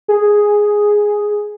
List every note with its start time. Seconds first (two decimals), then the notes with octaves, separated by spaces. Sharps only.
0.08 G#4